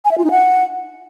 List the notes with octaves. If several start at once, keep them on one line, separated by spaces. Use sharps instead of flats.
G#5
E5
F4
D#4
F#5